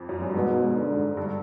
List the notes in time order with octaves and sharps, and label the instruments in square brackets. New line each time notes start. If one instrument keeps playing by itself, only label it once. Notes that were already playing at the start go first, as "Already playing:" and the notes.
Already playing: [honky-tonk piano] F2
F#2
G2
[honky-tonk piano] G#2 [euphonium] B2
[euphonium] D3
[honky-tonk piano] G2